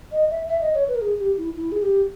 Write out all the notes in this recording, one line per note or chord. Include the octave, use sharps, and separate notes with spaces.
D#5
E5
E5
D#5
C#5
B4
A#4
G#4
G4
E4
E4
G#4
G4